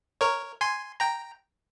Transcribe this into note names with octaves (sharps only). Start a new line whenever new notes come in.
A#4 C#5
G#5 C6
G5 A#5